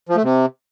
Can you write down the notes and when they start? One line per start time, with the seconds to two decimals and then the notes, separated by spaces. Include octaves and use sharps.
0.09 F3
0.16 A3
0.24 C3